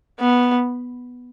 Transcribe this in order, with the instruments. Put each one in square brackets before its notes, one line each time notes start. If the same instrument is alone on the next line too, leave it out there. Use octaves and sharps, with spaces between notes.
[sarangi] B3